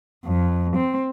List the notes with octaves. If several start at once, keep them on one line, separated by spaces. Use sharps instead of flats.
F2
C4